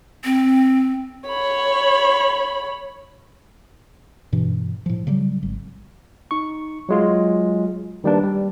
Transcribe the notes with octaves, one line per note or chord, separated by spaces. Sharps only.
C4
C#5 B5
G2 B2 E3
A2 F3
C#3 F#3 G3
G#1
D#4 C#6
F#3 G#3 F4
D#3 G3 A#3 D4 B4
G3